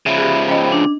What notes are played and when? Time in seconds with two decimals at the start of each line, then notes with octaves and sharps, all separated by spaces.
0.06 C#3 F3 E5 B5
0.18 G4 G#4
0.48 C#4 C5 D#5 G5 B5
0.72 D4